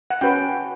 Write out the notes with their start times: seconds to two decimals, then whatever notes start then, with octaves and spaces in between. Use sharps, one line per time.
0.10 F#5
0.21 C#4 F#4 B4 G5